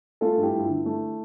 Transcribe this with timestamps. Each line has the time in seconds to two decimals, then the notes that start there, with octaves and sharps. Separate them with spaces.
0.21 A3 F4 A4
0.37 G2
0.43 E4 G4
0.53 G2
0.59 F4
0.64 E4
0.69 D3
0.86 A3